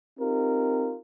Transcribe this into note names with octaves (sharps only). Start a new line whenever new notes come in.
C4 D#4 F4 G4 A#4